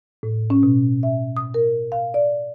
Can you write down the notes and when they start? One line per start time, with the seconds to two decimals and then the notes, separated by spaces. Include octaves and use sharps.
0.23 A2
0.50 C#4
0.63 B2
1.03 E5
1.37 D#6
1.54 A#4
1.92 F5
2.14 D5